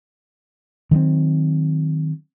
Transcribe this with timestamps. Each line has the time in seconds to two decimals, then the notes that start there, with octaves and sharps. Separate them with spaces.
0.91 D#3 F#3 A#3 C4